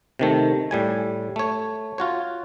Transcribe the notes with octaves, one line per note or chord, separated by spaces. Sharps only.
C3 D#3 A3
A2 G3 G#5
A3 C#5
F4 F#4 C#5